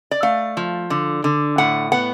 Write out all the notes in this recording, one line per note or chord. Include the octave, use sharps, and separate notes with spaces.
D5
A3 F5
F3
D3
D3
A2 F#5
B3 F#5